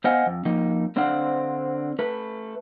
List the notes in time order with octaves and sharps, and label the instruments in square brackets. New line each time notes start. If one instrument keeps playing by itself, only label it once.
[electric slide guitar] B3 C5 D#5 F5 F#5 G#5
F2
F2 F3 A#3 D#4
D3 C4 D4 C5 F5 F#5
A3 B4